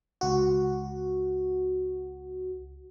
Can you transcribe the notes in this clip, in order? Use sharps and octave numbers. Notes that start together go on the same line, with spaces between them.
C#2 F#4